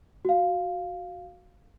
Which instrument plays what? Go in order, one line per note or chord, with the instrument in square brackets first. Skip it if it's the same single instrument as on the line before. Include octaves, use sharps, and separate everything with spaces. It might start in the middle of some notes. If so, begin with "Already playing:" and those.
[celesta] F#4 F5